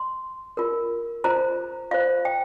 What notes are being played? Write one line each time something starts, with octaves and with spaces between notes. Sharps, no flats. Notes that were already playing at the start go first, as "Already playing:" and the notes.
Already playing: C6
F4 A#4
F4 C5 A#5
F4 C5 F5
G5